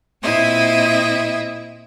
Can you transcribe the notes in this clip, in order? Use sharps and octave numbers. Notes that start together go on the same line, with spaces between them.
A#2 C4 E4 D#5 E5